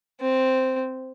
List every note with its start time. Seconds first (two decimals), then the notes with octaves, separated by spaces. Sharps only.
0.21 C4